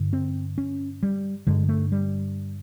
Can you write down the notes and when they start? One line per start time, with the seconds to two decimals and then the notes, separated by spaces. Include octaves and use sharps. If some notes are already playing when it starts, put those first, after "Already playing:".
Already playing: G2 D3
0.13 C4
0.58 C#4
1.03 G3
1.47 G2 D3 G#3
1.69 A3
1.92 G3